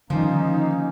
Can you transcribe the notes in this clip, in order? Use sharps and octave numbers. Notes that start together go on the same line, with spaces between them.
D3 D#3 F3 G3 A#3 C#4 D#4